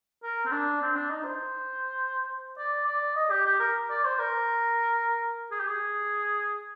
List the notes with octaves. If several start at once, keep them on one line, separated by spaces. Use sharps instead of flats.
A#4
C4
D4
C4
D4
D#4
C5
D5
D5
D#5
G4
G4
A#4
D5
C5
A#4
G#4
G4
G#4